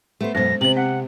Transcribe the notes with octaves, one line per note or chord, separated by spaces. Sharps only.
A3 B3 C5
F#2 B2 G#3 B3 C5 A#6
C3 C4 C5 F#7
C4 F#5